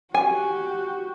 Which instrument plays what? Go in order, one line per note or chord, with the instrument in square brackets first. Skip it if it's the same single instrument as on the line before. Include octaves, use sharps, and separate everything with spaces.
[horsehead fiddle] F#4 G4 [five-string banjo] G#5